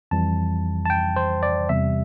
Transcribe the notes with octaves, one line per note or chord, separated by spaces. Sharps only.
F2 E3 G3 A5
A5
G5
C5
D5
E2 C3 G3 E5